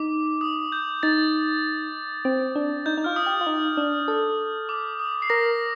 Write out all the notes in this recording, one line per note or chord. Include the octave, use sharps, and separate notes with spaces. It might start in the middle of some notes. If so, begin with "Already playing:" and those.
Already playing: D#4 D6
D#6
G6
D#4 A6
C4
D4
D#4 G6
D#4
F4 F6
D#6
G4
F4
D#4
D4
A4
D6
D#6
C7
A#4 A#6